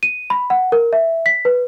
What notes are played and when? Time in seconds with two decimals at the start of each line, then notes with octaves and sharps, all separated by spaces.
0.03 D#7
0.30 B5
0.50 F#5
0.72 A#4
0.93 E5
1.26 B6
1.45 B4